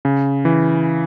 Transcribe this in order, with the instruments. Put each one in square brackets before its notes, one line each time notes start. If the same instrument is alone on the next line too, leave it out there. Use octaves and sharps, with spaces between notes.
[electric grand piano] C#3
E3